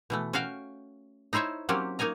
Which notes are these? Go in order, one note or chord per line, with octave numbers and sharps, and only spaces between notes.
B2 E3 A3
C#4 F#4 F5 G5
D#4 E4 C5 C#5 E5
F#3 A#3 C4 C#4 G4
A#3 D#4 C#5 G#5 A#5